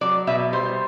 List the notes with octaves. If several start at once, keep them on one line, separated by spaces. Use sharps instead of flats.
F#3 D5
B2 E5
G3 C5